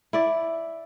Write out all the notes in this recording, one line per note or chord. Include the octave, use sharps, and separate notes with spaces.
E4 D5